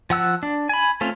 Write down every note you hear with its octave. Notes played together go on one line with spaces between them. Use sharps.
F3 F#5 E6 F#6
D4
G#5 B5
A3 C4 C#4 F4